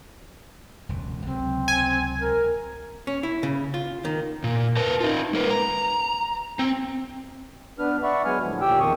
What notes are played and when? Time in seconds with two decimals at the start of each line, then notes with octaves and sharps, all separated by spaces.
0.89 E1 C#2
1.26 C#2 C3 F#3 C4
1.68 G#5
2.21 A#4
3.07 C#4
3.23 E4
3.43 C#3
3.74 F4
4.05 D#3
4.44 A#2
4.77 A#4 B4 A5
5.00 D#4 F4
5.33 G#3 A#4 B4
5.50 A#5
6.59 C4
7.79 B3 D4 B4 F6
8.03 D5 E5 F#5 B5 C#6
8.25 F#3 G#3 B3 G#5 F6
8.41 A2 D3 F3
8.61 D#2 A#2 G4 G5 E6
8.80 E2 D#3 F3 C4 C#6 D#6